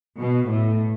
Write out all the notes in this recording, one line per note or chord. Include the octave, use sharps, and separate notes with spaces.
B2
A2